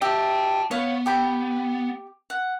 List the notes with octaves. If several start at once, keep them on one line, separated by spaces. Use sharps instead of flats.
G4 D#5 E5 G5 A5
B3 C#5 F5
G4 G5 B5
F#5